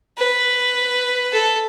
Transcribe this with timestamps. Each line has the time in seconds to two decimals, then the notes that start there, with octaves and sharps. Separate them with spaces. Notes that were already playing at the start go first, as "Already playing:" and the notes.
0.18 B4
1.32 A4